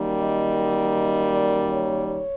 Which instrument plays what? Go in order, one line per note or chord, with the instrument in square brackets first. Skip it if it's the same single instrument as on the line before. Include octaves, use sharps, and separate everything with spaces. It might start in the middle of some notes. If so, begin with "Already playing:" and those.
Already playing: [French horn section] F#2 D#3 G3 A#3
D#5
D5
C#5
C#5